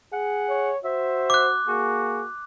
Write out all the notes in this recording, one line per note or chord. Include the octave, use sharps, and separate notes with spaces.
G#4 F#5
C#5
F#4 C5 E5
D6 F#6
A#3 F#4 G#4